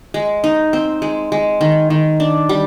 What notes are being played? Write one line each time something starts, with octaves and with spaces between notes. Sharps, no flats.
G#3
D#4
C4
G#3
G#3
D#3
D#3
D4
G3